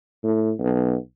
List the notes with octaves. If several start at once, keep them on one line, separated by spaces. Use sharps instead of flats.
A2
B1